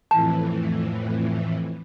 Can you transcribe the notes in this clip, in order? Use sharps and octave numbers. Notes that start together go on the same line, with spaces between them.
F2 A2 E3 A5